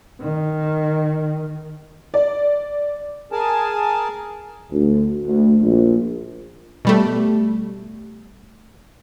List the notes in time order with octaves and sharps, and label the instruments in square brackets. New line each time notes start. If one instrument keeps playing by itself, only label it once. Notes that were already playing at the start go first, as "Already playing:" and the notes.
[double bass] D#3
[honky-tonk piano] D5
[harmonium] G#4 A#4 G#5 A5
[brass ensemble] D2
D2
A#1
[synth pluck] B2 G3 A3